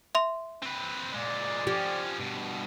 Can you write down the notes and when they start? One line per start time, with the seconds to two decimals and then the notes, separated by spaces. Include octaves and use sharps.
0.15 E5 C6
0.62 C4 B4
1.14 A#2 G#3 D5
1.67 F3 C#4 G4
2.20 G2 B2